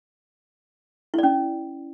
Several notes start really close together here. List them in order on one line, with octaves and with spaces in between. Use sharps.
E4 D5 C#4